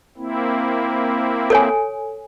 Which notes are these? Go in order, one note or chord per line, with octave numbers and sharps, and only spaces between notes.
A#3 C4 E4
A4 C#5 G#5